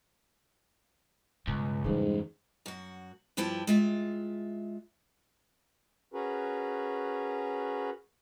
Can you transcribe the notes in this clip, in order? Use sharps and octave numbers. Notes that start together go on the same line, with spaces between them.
C#2 G2 B2
F2 G#2 C#3 E3 G3
F#2 F#4
G2 F3 E4 G4 G5 A5
G#3 F4 E5
C#4 F#4 G#4 A#4 B4